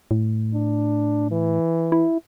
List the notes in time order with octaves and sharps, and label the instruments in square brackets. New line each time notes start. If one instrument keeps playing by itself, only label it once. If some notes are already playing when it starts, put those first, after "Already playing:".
[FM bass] A2
[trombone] D4
E3
[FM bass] E4